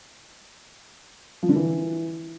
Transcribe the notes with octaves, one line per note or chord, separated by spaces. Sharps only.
F3
D3
E3